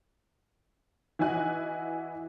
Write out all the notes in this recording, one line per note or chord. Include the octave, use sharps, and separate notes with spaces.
E3 E4 F#4 D#5 G#5 F#6